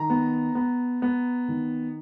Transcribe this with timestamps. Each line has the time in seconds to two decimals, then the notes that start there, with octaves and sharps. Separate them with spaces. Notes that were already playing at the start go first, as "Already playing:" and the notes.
Already playing: D#3 A#5
0.10 B3
0.55 B3
1.02 B3
1.48 D#3